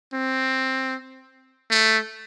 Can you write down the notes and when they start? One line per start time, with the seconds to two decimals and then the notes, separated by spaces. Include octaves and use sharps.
0.13 C4
1.71 A3